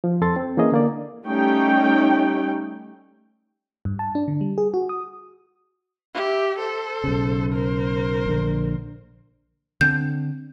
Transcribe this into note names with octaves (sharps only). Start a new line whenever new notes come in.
F3
F2 A4 C6 A6
C4
E3 A#3 C#4 G#4 D#5
D3 A#3 D5
G3 A3 C#4 D#4 G5
G2
A5
D4
D3
G3
G#4
F#4
D#6
G4 E5
A4 C5
B1 C#3
A#4 C5
A#1 D3
D3 C4 D4 G6